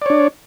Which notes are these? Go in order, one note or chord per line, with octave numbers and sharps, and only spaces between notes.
D4 C#5 D5